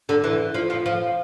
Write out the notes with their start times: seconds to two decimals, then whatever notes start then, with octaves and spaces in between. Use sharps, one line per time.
0.09 D3
0.24 E3
0.54 F3
0.70 F3
0.86 F3